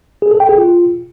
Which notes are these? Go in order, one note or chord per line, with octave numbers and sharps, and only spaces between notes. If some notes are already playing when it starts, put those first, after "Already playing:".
G#4
A4
G5
G#4
F4